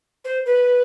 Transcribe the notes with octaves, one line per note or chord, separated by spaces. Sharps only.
C5
B4